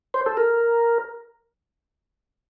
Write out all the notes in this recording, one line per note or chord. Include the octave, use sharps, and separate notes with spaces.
C5
A4
A#4